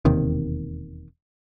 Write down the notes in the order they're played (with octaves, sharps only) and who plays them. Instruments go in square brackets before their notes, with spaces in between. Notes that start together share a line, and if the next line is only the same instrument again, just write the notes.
[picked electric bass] E1 D#2 C3 D#3